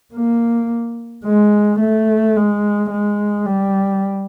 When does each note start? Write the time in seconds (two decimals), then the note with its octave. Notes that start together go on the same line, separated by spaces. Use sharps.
0.14 A#3
1.25 G#3
1.80 A3
2.36 G#3
2.91 G#3
3.46 G3